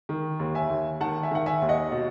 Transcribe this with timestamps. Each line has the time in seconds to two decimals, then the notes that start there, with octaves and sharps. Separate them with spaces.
0.09 D#3
0.40 D#2
0.55 E5 G#5
0.70 D#2
1.00 D#3 F#5 A5
1.23 E5 G#5
1.31 D#3 F#5
1.46 E5 G#5
1.62 D#2
1.69 D#5 F#5
1.92 B2